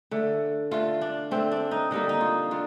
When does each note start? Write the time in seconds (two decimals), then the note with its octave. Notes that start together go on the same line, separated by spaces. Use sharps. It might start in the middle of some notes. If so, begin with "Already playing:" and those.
0.11 D3 A3
0.71 D3 A3 F4
1.01 D4
1.31 D3 A3 C4
1.51 D4
1.71 D#4
1.91 D3 G3 A#3 D#4
2.09 D#4
2.21 F4
2.51 D3 F4